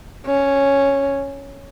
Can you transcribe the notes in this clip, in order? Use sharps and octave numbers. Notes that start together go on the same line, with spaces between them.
C#4